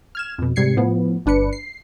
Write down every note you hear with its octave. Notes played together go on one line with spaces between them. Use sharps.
F6 G#6 E7
F2 B2
G#2 C3 G3 G#6 C7 C#7
A2 F3 B3
G1 D4 B4 C#7
C7